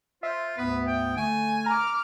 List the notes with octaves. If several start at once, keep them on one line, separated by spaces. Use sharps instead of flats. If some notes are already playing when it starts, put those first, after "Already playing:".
F4 C5 E5
D2 G#2 B3 B4
G5
D3 A3 G#5
A#5 D6 F6